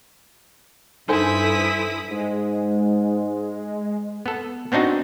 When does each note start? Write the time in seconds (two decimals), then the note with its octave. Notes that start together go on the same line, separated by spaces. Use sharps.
1.09 G2 D#4 E4 A4 C5 G#5 D#6 B6
2.11 G#2 G#3
4.26 B3 A4
4.72 B3 C4 D4 D#4 F#4